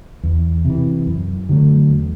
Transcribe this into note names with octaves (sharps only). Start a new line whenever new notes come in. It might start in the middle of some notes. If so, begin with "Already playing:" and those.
E2
C3 E3
F#2
D3 F#3 A3
E2